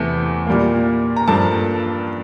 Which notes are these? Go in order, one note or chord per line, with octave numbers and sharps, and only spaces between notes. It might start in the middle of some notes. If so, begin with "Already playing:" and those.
Already playing: E2 C3 E3 A3
A#2 G3 A#3
A#5
G2 F3 A#3 A4 A5